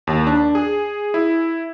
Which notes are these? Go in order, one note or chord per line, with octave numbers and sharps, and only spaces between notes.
D#2
D4
G#4
E4